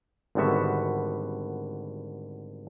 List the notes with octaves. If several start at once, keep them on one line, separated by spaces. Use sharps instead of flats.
G#1 D3 G3 B3 F#4 E5